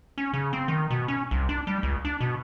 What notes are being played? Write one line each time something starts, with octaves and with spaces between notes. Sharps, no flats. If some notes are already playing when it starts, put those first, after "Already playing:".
C#4
C#3
C4
D#3
B2
C#4
C2
D4
G3
C#2
D4
B2